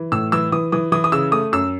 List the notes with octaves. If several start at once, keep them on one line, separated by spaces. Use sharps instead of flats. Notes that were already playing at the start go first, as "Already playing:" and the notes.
Already playing: E3
A2 E6
E3 E6
E3 D#6
E3 D#6
E3 D#6
D#6
C#3 E6
A3 D#6
F#2 E6